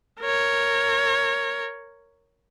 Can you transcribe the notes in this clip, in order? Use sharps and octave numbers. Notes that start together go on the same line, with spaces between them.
A#4 C#5